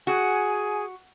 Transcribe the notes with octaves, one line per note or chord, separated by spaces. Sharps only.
F#4 G#4 G#5